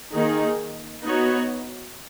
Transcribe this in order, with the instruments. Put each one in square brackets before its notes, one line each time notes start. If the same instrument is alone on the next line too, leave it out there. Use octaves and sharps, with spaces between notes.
[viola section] D#3 A#3 D#4 G#4
B3 D#4 F#4 C#5